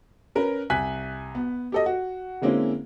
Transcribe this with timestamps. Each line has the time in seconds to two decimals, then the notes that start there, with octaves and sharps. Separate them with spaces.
0.35 C#4 A#4 B4
0.70 C2 G#5 F#6 B6
1.35 B3
1.72 G4 A4 D#5
1.86 F#4
2.42 D3 G#3 A#3 C4 C#4 E4